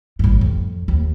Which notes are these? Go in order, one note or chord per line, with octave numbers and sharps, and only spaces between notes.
A1 G2
F2
D#2